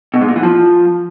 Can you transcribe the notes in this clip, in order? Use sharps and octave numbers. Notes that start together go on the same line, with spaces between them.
B2
G#2
A#2
E3
F3